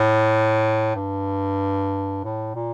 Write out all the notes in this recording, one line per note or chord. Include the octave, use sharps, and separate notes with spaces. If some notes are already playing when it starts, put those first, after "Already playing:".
Already playing: A2
G2
A2
A#2